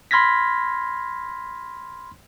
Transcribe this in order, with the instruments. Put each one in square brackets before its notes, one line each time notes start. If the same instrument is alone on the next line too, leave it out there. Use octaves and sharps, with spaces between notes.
[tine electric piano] B5 C6 F6 G#6 A#6 B6